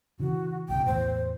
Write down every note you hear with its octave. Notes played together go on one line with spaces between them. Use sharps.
C#3 E3 F#4
B1 G#2 C#3 G5
E2 A2 E3 C5